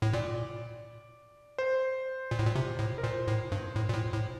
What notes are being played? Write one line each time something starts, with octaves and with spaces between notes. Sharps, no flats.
A2
A#2 D5
C5
A#2
A2
A#2
C3
A2
A#4
A#2 C5
A2
G2
A2
A#2
A2
A2